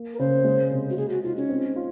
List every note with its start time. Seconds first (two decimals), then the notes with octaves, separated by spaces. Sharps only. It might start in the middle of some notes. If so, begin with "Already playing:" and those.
Already playing: A#3
0.14 A#4
0.19 C#3 C5
0.45 G#3
0.71 C3
0.90 F#4
0.97 G#3 G#4
1.10 F#4
1.23 D#4 F4
1.37 C#4
1.49 C4
1.76 F4